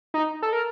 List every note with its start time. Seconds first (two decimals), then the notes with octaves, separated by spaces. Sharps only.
0.14 D#4
0.43 A4
0.53 A#4